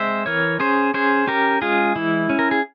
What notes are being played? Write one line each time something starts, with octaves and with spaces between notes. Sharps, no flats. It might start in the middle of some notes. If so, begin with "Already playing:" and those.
Already playing: G#3 C4 C5 E5
E3 A#4 C#5
C#4 G#4 C5
C#4 G#4 C5
C#4 G4 A#4
G#3 F4 G#4
E3 E4
C#4
A#4
G#4